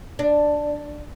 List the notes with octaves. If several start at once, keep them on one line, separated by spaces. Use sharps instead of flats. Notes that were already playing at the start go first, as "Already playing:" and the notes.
D4